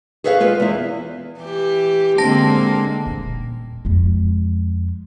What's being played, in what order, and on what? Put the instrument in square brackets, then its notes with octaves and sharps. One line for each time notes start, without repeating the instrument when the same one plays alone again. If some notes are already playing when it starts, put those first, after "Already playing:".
[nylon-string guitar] G#4 A4 B4 C#5 D#5 F5
G#3 F4 B4
E2 E4
[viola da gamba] E3 G4
[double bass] D3 C4 [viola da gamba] G#3 A#3 [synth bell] A5 A#6
[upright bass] D#1
F2 G#3